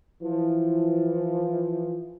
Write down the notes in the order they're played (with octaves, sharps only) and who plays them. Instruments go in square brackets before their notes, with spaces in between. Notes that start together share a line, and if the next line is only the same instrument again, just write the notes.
[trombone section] E3 F3